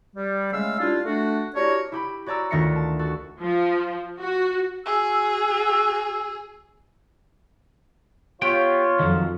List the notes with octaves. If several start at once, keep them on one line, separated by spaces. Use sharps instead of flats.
G3
C#3 G#3 A3 C#4 F5 E6
G3 D4 E4 F4
A3 D4 F#4
D4 E4 F#4 G4 A#4 C#5
E4 G4 B5
F#4 C#5 D5 A#5 E6
D2 D#3 F4 E5 A#6 C#7
A5
F#4 A4
F3
F#4
F#4 G#4 E6
B3 F4 G4 C#5 G5
F2 D#3 F3 F#3